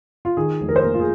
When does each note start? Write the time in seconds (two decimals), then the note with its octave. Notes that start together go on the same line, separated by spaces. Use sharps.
0.25 F4
0.37 D#3 G#4
0.61 F1
0.69 A#4
0.76 C5
0.82 A#3 A#4
0.94 F4
1.00 G#4